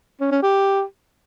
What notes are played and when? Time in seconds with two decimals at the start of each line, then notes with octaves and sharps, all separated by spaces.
0.21 C#4
0.32 C#4
0.43 G4